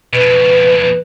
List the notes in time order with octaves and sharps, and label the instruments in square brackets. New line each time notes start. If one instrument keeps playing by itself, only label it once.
[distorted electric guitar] F2 B2 [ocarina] B4